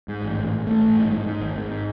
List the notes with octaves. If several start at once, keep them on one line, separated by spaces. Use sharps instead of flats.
G#2
A1
A1
A1
A1 A3
A1
G#2
G#2
G#2
G#1
G#2